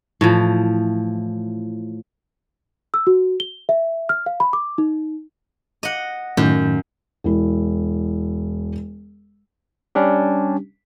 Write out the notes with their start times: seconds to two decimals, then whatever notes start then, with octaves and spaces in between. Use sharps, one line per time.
0.21 A2 E3 F3
2.94 E6
3.07 F#4
3.40 G7
3.69 E5
4.09 F6
4.26 F5
4.40 B5
4.53 D6
4.78 D#4
5.83 D#5 F#5
6.37 F#2 A2 D#3
7.24 E1 E4
9.95 G3 C#4 D4 G4